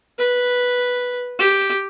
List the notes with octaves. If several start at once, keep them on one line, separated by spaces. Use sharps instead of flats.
B4
G4